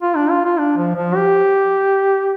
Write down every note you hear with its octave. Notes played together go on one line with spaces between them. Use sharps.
F4
D4
F4
F4
D4
F3
F3
G4